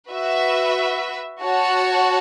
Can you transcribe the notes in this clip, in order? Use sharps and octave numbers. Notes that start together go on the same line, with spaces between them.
F#4 B4 E5
F#4 C#5 F#5 A5